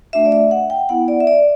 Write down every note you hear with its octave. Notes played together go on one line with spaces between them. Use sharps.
A3 D4 F#4 E5
D5
E5
F#5
G5
B3 E4 F#5
D5
E5
D5